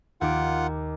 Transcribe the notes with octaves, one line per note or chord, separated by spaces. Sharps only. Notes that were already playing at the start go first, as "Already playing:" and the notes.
D#2 F4 F#5 D6